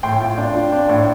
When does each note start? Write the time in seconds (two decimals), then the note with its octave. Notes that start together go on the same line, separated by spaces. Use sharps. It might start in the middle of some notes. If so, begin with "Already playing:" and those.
0.03 A2 G5 C6
0.20 F4
0.38 D4
0.55 F4
0.72 D4
0.89 A2